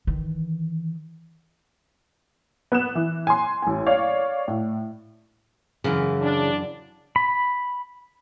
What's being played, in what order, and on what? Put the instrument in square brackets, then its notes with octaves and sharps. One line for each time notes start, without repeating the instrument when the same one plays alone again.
[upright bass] D#3 E3
[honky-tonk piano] B3 F#6 E7
E3
G#5 C6
A1 G#5
C#5 D5 F5
A2
[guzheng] F#2 E3 [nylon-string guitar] C#3
[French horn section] D4
[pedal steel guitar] B5